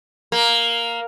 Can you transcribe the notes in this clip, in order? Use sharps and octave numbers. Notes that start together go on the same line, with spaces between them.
A#3